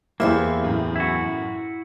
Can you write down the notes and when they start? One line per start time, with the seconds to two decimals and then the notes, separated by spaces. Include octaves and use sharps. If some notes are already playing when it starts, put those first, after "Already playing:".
0.20 E2 G2 A#3 E4 G4 C5 E5
0.63 F#2 A2
0.96 E4 F#4